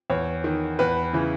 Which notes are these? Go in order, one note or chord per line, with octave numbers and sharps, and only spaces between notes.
E2 C#5
D#3
E2 B4
C#3 E3